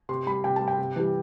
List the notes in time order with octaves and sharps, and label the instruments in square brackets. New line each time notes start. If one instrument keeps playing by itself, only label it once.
[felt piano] C3 C6
G3 B5
C3 G5
G3 A5
G5
C3
E3 G3